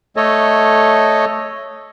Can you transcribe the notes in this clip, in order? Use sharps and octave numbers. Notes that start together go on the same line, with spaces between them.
A3 A4 C#5 D#5